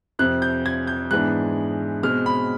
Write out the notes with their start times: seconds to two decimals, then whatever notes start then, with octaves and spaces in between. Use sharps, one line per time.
0.19 F2 C3 F3 F#6
0.42 G6
0.66 G#6
0.87 G6
1.11 G#2 E3 G#3 B3 D4 F#6
2.03 B2 G#3 C4 F6
2.26 B5